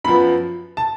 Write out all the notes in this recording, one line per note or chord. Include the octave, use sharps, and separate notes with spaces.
F#2 F3 B3 B5
A5